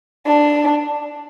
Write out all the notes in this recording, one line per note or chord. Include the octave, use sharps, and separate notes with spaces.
D4